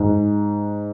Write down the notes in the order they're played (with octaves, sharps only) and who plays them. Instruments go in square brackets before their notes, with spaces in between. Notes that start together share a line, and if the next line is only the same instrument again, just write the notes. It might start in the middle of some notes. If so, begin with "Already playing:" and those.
Already playing: [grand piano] G#2